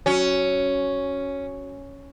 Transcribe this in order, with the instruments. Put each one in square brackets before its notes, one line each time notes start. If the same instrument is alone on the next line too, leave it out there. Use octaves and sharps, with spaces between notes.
[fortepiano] F#3 [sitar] C#4